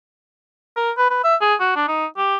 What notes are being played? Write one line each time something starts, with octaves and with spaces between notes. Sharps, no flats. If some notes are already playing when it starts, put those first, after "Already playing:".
A#4
B4
B4
E5
G#4
F#4
D4
D#4
G4